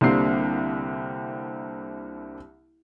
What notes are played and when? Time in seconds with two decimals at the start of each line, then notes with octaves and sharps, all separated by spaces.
0.01 C2 D3 G3 A#3 C4 C7